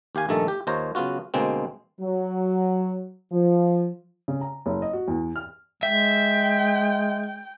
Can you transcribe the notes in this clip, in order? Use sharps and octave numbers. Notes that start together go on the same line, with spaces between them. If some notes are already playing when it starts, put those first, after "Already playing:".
D#2 G4 F5 G#5
A#1 G2 D#3 A3 A4 A#5
G4
D#2 D#4 F4 C5 C#5 A#5
C#3 F#3 B3 F4 F#4
D2 B2 G#3 A#3 C4
F#3
F3
C#3
A#5
F#1
D#5
F#4
E2
F6
G#3 E5 G5